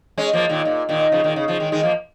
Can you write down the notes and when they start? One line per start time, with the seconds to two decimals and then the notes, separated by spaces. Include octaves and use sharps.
0.18 G#3 C#4
0.33 F3 A#3
0.50 A#2 D#3
0.65 A#2
0.89 A#2 D#3
1.12 C#3 F3
1.24 A#2 D#3
1.36 C#3
1.48 C#3 F3
1.60 D#3 G#3
1.72 D#3 G#3
1.83 F3 A#3